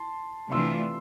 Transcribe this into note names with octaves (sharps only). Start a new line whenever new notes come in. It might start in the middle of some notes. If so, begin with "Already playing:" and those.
Already playing: A5 C6
C3 E3 A3 D4 F4 C6 E6